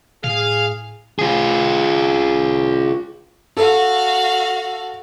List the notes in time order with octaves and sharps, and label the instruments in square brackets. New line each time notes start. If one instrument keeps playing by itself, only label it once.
[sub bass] A2 [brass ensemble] G#4 [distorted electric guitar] F5
[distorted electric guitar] F4 G#4
[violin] F#4 F5 [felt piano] A4